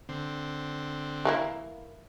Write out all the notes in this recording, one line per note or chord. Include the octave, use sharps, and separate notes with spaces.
D3 C4
E3 A#3 E4